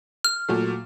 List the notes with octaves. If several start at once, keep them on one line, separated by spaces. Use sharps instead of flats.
F6
A#2 F#3 A3